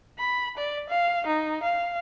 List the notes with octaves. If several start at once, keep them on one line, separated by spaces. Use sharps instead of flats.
B5
D5
F5
D#4
F5